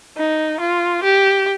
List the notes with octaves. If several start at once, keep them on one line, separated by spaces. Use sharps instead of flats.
D#4
F4
G4